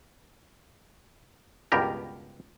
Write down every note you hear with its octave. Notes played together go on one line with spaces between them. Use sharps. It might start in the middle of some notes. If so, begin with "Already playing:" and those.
C#2 G2 B2 G4 A#4